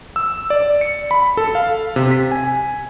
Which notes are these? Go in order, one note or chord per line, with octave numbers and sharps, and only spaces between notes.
E6
D5
C#7
B5
A4
F5
C3
B6
G#5